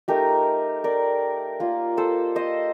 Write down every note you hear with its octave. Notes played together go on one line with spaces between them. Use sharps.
A3 D#4 G4 A#4
A#4 D5
A#3 F4
A4 C5
C5 D#5